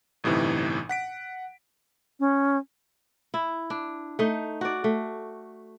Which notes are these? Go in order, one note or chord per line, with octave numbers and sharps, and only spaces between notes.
G1 A2 C3 E3 D#4
F#5 B6 D7
C#4
E4
D4
A3 D#4
F#4 D5
A3